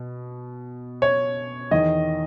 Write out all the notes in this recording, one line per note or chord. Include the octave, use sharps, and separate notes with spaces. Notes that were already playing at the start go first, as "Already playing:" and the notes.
Already playing: B2
C#5
E2 D#3 D#5